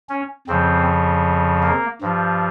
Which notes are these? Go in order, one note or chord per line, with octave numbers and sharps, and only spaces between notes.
C#4
F2 C#3 F3 C4
A#3
G2 F3